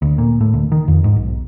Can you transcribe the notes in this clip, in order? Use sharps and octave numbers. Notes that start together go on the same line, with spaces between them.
D2
A#2
A2
D2
D#3
F2
G#2
B1